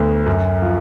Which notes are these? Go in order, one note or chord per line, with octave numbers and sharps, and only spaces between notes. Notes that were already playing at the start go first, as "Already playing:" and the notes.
Already playing: D2 B3
F#2
F3